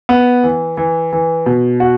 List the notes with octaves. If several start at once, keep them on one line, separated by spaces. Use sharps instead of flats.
B3
E3
E3
E3
B2
F#4